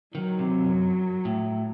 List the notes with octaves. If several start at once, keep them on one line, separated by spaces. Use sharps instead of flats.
D#3 F#3
C3
F#2
A2